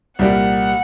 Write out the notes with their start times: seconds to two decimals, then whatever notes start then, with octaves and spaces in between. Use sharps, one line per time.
0.19 C2 A#2 G3 A#3 F#5